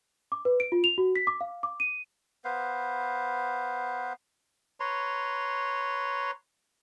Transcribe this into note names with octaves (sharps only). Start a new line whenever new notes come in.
D6
B4
D7
F4
F7
F#4
B6
D6
F5
D6
D#7
B3 B4 C5 F5
B4 C#5 A#5 C6